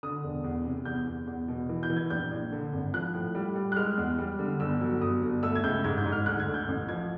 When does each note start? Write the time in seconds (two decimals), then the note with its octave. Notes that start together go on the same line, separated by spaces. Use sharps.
0.03 D3 D#6
0.24 E1
0.44 E2
0.65 C3
0.85 E2 G6
1.07 E2
1.27 E2
1.48 B2
1.69 E3
1.83 G6
1.90 E3
1.96 G#6
2.10 A#1 G6
2.31 A#1
2.52 D3
2.73 G#1
2.94 F3 F#6
3.14 A2
3.35 G3
3.56 G3
3.72 F#6
3.76 G#3 F6
3.97 E2
4.18 G3
4.39 D3
4.60 G1 E6
4.81 F#3
5.01 G1 D#6
5.23 G1
5.43 A3 E6
5.55 G#6
5.64 C#2 G6
5.84 G#2 G#6
5.98 G6
6.05 G#2
6.12 F6
6.26 D2 F#6
6.40 G#6
6.47 D2
6.54 G6
6.68 A1
6.88 F3 G#6